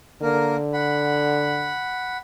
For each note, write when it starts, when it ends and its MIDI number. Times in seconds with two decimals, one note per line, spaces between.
0.22 1.76 50
0.22 0.56 58
0.22 0.56 70
0.73 2.17 78
0.73 2.17 83